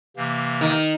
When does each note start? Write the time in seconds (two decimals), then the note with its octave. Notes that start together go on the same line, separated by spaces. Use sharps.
0.17 C3 E3 A#3
0.61 D#3